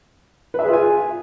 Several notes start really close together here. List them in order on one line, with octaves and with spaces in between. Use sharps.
B4 E5 G#4 F4 G#5